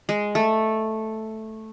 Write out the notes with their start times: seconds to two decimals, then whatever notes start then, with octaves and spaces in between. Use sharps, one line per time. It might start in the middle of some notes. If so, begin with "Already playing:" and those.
0.09 G#3
0.35 A3